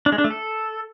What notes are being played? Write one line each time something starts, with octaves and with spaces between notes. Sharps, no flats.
D4
G#3
D4
A3
A4